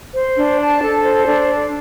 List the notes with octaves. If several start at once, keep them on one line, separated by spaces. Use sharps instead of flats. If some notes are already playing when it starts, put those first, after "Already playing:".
C5
D4
A5
A4
C5
D4